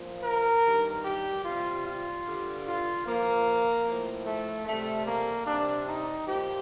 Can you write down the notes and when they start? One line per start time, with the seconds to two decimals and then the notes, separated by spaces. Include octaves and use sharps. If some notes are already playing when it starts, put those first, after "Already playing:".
Already playing: A#2 F3
0.24 A#4
0.64 G2 D#3 G3
1.05 G4
1.45 C3 G3 F4
1.85 F4
2.25 G2 D3 G3
2.66 F4
3.05 A#2 F3 A#3
3.86 A2 F3
4.26 A3
4.66 C3 G3 A3
5.06 A#3
5.46 C3 G3 D4
5.87 D#4
6.27 A#2 F3 G4